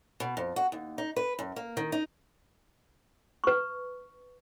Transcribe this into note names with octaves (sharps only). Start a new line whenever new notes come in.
B2
F2
F#4
D#2
D#4
B4
F#2
A#3
D#3
D#4
B4 C#6